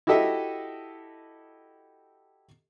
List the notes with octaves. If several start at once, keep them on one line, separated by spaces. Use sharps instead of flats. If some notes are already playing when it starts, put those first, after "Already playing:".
E4 F#4 G4 A4 D#5 E5